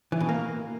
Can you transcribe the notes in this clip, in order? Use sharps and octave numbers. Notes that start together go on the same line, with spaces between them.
E3
B2
A#3